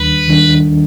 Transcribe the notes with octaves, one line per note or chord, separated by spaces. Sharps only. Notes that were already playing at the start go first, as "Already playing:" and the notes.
Already playing: D#2 D#3 G3 D4 B4
D#3 G3 D4